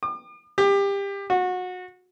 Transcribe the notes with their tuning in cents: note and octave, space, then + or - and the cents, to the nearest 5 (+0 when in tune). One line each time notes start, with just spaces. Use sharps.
D6 +45
G4 +25
F#4 -25